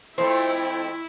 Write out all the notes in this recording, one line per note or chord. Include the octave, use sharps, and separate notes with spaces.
F2 F3 A3 C4 E4